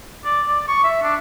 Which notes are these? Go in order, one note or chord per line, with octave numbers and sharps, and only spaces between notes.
D5
D5
C#6
E5
D4